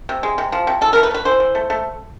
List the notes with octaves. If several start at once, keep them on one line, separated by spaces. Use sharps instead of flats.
C3
G#3
C3
F3
C3
E3 A4
A#4
A3
B4
A3
B4
E3 C5
E3
A3
A3